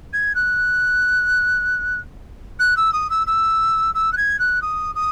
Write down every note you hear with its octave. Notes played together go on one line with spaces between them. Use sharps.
G#6
F#6
F#6
E6
D#6
E6
E6
E6
F#6
G#6
F#6
D#6
D#6